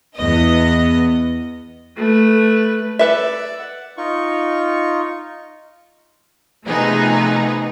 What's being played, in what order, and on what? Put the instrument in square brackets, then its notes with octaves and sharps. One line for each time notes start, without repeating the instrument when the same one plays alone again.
[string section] E2 B3 D#5
[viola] A3 B4
[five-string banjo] A4 B4 E5 [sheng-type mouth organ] D5 D6 E6
[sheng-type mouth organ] F#5
D#4 F4 C#6
[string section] C3 F3 A3 B3 D#4 G#4